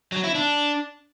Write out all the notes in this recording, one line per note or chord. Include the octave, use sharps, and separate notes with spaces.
F#3
E4
D4